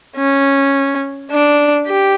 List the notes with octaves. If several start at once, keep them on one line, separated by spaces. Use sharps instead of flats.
C#4
D4
G4